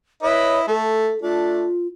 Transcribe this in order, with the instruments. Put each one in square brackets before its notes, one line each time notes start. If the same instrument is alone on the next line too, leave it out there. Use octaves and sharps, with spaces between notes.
[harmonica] E4 B4 D#5 [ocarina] C#5
[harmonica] A3 [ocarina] A4
[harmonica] A3 D4 [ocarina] F4